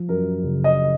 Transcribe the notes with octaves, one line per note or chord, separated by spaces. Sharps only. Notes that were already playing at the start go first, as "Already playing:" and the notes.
Already playing: F3
F#2 A#4
F#1
D#5